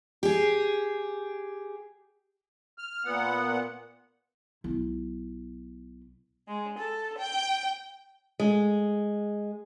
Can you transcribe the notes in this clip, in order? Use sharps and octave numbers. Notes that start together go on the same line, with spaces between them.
G4 G#4
F6
A#2 B3 F#5
B1 E4
G#3
A4
G5
G#3